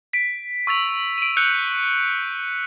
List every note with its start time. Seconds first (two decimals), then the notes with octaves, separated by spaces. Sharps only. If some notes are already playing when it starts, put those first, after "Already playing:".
0.13 B6 D7
0.67 C#6 E6 A6 F7
1.18 D7 D#7
1.37 E6 F#6 G6 C#7 F7